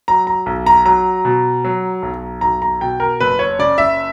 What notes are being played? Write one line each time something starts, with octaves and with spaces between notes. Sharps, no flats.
F#3 A#5
A#5
B1
A#5
F#3 A#5
B2
F#3
B1
B1 A#5
A#5
B2 G5
A#4
F#1 B4
C#5
C#3 D5
E5